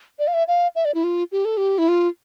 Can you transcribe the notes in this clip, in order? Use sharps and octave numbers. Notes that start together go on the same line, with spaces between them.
D5
F5
E5
F5
E5
D5
E4
F4
G4
A4
G4
E4
F4